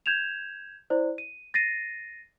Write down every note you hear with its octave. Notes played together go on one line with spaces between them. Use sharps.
G6 G#6 E7 F7
E4 C5 D5
D#7
A6 A#6 C7 D#7